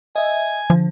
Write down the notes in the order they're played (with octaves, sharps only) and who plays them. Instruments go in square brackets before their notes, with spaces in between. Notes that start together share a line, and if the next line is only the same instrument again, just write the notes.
[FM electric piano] D#5 E5 [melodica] G#5
[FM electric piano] D3 [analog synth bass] F3